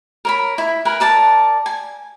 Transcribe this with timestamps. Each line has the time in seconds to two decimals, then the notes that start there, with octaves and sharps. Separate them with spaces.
0.25 A#4 C#5 B5
0.58 E4
0.85 A#4 B4 G#5
1.00 A#4 D5 A5
1.66 G#5